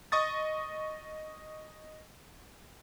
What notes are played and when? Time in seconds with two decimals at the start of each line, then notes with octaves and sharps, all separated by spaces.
0.12 D#5 C#6 D#6 A6